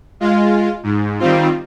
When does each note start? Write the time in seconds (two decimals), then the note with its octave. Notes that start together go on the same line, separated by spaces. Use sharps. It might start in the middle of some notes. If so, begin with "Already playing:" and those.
0.20 G#3 F4
0.83 G#2
1.19 D#3 G3 C4 F4